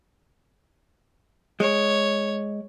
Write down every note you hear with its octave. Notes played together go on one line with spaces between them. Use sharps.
G#3 C#5